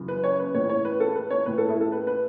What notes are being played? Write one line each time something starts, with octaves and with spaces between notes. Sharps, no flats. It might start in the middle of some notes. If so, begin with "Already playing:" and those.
Already playing: F#2 C#3 E3
B4
C#5
B4
A2 E3 C#5
C#5
B4
A4
B4
C#5
A2 E3 B4
A4
E4
A4
B4
B4